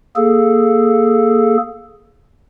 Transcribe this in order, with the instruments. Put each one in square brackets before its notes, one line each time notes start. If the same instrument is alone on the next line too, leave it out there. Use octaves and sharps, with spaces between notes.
[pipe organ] A#3 G#4 A4